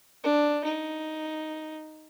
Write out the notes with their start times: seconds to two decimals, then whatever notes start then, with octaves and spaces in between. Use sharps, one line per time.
0.23 D4
0.64 D#4